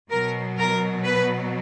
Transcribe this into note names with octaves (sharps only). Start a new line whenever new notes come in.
B2 F#3 A#4
A#4
B4